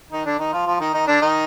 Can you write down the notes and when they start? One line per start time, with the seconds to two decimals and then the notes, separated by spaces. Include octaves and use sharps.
0.12 D#3 D#4
0.25 D3 D4
0.39 D#3 D#4
0.53 F3 F4
0.67 F3 F4
0.80 D#3 D#4
0.93 D#3 D#4
1.07 D3 D4
1.21 D#3 D#4